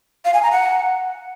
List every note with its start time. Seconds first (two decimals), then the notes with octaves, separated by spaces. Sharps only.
0.25 F5
0.34 G#5
0.43 A#5
0.52 F#5